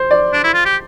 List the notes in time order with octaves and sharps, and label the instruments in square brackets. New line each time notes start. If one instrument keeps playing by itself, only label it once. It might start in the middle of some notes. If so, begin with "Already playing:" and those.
Already playing: [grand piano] C5
D5
[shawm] D4
E4
F4
G4